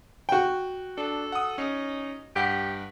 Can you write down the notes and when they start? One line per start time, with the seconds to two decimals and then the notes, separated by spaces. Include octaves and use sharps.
0.29 F#4 G5
0.98 D4 A4
1.32 F#5 D#6
1.58 C#4 D#4
2.36 G2 G4 F#5 B6